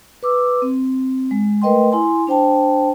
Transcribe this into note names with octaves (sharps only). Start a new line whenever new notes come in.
B4 D6 E6
C4
G#3
A3 A#4 B4 D#5 G5 C6
E4 G#5 C6
D4 C5 G5 A5